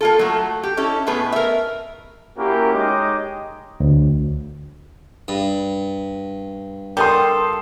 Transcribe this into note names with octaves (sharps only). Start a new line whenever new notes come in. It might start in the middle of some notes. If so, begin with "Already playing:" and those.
A#3 F4 A4
F#3 A3
G4
C#4 E4 A4
A2 A3 B3 G#4 B4
A#4 E5
A#3 C#4 E4 F#4 G4 A#4
G#3 D#4 G4 C#5 D#5 D6
D2
G2
G3 A4 A#4 F5 G5 C6 D#6